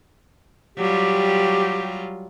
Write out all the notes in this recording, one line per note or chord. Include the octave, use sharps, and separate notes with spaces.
F#3 G3 F4 G4